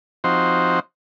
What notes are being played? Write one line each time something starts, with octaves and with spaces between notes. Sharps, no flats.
F3 C4 D#4 F#4 C5